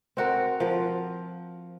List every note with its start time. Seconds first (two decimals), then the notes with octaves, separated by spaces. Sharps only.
0.17 C4 F#4 A#4
0.60 F3 A#4